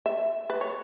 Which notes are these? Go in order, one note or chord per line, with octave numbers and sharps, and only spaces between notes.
E5
B4
C#5